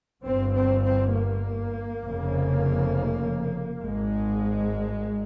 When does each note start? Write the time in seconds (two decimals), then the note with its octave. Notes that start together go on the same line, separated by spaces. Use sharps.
0.24 G1 G2 C4
0.54 C4
0.84 C4
1.13 A#3
2.03 F1 F2 C#3
3.82 G#1 G#2 G#3